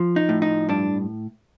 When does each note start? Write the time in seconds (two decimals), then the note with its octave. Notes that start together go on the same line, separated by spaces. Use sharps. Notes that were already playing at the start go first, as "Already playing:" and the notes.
Already playing: F3
0.16 D#4
0.29 A2
0.42 D#4
0.69 G2 D4